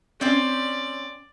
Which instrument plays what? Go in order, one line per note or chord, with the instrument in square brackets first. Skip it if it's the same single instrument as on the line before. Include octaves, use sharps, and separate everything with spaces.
[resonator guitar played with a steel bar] C4 C#4 [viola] D5